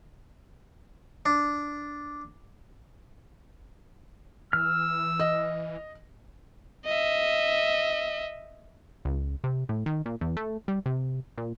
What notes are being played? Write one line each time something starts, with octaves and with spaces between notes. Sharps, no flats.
D4
E3 E6 F6
D#5
D#5 E5
C#2
C3
A2
D#3
A#2
E2
A3
G3
C3
A#2